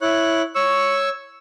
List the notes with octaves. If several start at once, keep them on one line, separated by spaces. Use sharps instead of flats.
E4 C#5 F#6
C#5 C#6 E6